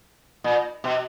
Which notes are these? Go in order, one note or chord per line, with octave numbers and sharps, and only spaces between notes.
A#2
B2